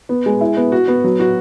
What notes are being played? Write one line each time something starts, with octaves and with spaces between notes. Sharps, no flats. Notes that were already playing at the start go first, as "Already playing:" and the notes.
B3
G#3
E4
B3
F#4
B3
F#3
F#4